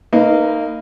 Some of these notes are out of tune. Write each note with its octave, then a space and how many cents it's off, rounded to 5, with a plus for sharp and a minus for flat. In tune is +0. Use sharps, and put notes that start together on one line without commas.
A#3 -25 D#4 +0 B4 +0